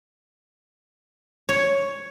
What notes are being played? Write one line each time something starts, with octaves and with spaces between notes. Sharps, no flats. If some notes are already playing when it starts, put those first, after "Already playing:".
C#5